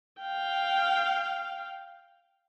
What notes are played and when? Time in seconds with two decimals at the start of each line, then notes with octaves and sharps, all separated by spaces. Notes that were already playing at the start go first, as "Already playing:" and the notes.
0.21 F5 G5